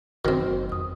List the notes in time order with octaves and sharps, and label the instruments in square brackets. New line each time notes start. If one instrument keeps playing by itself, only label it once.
[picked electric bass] F#1 [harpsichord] D#3 C4 [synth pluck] D#4 A#4 [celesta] F#4
[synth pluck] F2 [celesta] D#6